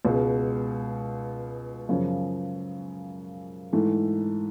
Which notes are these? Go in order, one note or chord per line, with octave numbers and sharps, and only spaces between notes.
C#2 B2 G#3
F#2 C#3 F3
G#2 E3 A3